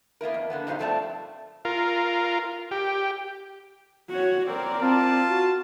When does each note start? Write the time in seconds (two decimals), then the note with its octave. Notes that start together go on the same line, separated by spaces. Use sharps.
0.21 A#3 B3 E4 A#4
0.34 F2
0.50 D3 A#3 B3
0.67 F2 B2 G3 D#4 C5 F5
0.79 G2 F3 A3 C4 D5 A5
1.65 F4 A#4
2.71 G4
4.10 F#4 C#5
4.47 C4 A#4 D5
4.82 C4 F4 A5
5.30 F#4